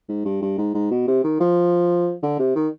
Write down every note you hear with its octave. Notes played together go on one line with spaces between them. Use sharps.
G#2
G2
G2
G#2
G#2
B2
C3
D#3
F3
D3
C3
D#3